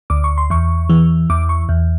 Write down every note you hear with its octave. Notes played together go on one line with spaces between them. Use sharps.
D2 D6
C#6
C6
E2 C#6
E3
E2 D6
C#6
E2